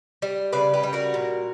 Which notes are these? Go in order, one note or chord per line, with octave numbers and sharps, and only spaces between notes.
G3
C#3 B4 D5
G4 B4
G3
F#4 A#4
A#2